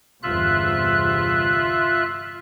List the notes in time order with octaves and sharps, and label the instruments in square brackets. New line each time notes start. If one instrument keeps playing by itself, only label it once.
[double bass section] G1 E2 C3 [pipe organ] F4 E5 F#6